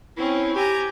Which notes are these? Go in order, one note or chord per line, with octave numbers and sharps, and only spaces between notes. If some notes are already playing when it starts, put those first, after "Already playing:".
C4 C#4 E4
G4 G#5 A#5